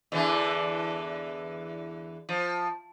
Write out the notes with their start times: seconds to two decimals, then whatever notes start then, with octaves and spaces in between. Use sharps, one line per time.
0.12 E2 D3 E3
2.29 F3